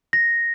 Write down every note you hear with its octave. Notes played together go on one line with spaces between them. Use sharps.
A#6